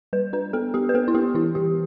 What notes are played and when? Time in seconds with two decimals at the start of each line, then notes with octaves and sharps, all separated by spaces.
0.13 G3 B4
0.33 D4 B4
0.53 B3 A4
0.74 B3 G4
0.89 B4
0.94 B3 A4
1.08 E4
1.14 B3 G4
1.35 E3 E4
1.55 E3 G4